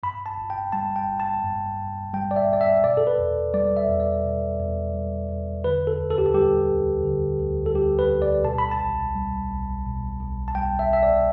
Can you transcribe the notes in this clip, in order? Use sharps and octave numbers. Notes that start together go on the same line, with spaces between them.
G2 B5
A5
G1
G5
G3 A5
G5
G1
A5
G2
G1
G3 G5
D5
E5
G1 D5
E5
B2 D5
A4
B4
E2
G3 D5
E5
E2
D5
B2
E2
G3
E2
D3 B4
A4
D2
A4
G4
A4
G3 G4
D2
D3
D2
A4
G3 G4
B4
D2
D5
B2 A5
B5
A5
B1
G3
B1
B2
B1
A5
G3 G5
E5
B1 E5
D5